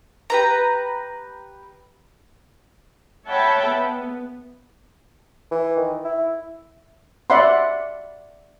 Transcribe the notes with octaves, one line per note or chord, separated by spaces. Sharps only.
G4 B4 A#5
C#5 E5 F#5 G5 A5 B5
B3
E3
D#3
E4
D5 E5 F#5 B5 C6